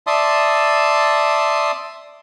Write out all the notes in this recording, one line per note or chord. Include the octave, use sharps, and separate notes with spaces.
D5 E5 A5 C6 D#6